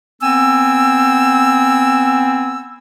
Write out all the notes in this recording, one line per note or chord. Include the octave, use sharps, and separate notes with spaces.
B3 C4 G#5 E6